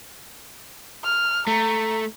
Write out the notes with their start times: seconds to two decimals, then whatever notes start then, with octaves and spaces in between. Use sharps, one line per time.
1.04 F6
1.47 A3 A#5